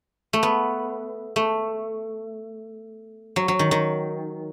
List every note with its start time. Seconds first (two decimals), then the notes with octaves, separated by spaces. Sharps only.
0.33 A3
0.43 B3
1.36 A3
3.36 F#3
3.48 F#3
3.59 D#3
3.71 D#3